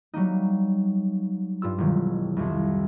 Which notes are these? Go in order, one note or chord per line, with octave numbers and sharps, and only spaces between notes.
F#3 G3 A#3 D#4
G2 F4 E6
E1 D#3 F#3
C2 F2